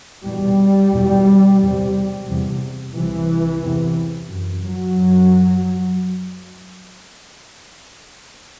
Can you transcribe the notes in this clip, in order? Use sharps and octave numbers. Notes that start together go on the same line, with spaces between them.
E2 B2 G3
E2 B2
E2 C3
E2 C3
C2 C3 E3
E2 C3
F#2
F#3
F#2